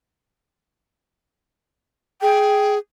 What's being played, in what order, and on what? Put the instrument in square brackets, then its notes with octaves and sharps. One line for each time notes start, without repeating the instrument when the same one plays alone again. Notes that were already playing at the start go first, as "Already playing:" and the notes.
[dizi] G#4 [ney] G5